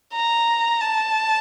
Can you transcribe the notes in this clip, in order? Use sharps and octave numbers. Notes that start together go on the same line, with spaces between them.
A#5
A5